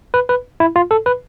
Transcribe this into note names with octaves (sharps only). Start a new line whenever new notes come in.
B4
B4
E4
F4
A4
B4